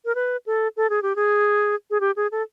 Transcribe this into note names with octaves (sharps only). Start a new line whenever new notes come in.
A#4
B4
A4
A4
G#4
G4
G#4
G#4
G4
G#4
A4